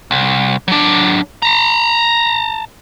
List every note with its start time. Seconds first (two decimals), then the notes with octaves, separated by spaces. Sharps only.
0.11 C2
0.68 F#3 D4
1.42 A5 A#5